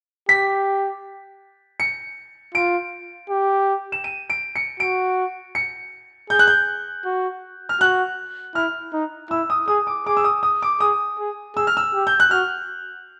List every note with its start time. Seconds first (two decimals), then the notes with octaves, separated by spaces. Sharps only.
0.29 G4 B6
1.80 C#7
2.54 F4 D7
3.30 G4
3.92 E7
4.04 D#7
4.30 D7
4.56 C#7
4.80 F#4 D7
5.55 C#7
6.30 G#4 G6
6.39 F#6
6.47 G6
7.05 F#4
7.69 F6
7.81 F#4 F#6
8.55 E4 F6
8.93 D#4
9.31 E4 E6
9.50 D#6
9.68 G#4 D#6
9.87 D6
10.06 G#4 D6
10.17 E6
10.24 D#6
10.43 D#6
10.62 D6
10.80 G#4 D#6
11.19 G#4
11.56 G#4 E6
11.67 F6
11.77 E6
11.93 G4
12.07 G6
12.20 F#6
12.31 F#4 F6